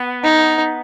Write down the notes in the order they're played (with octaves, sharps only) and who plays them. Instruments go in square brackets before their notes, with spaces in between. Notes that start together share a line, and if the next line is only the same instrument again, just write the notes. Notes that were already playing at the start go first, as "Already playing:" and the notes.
Already playing: [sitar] B3
[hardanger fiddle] D#4